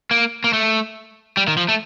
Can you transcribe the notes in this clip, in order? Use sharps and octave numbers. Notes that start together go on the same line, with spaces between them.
A#3
A#3
A3
G3
D#3
F3
A3